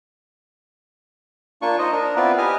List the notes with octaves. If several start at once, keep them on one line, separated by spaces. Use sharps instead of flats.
A#3 D4 F4 C#6
D#4 C5 D#5
D4 A#4
B3 C4 E4 F4 B4 D5
G4 B4 D#5 G#5 F6